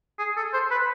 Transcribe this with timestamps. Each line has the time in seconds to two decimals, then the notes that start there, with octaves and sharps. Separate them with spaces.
0.19 G#4
0.37 A4
0.53 C5
0.71 B4